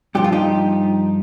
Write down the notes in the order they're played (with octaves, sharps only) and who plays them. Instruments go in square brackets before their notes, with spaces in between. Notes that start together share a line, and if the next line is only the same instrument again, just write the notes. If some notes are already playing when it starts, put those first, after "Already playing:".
[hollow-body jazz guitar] G2 F3 G4
F4
D#4 G4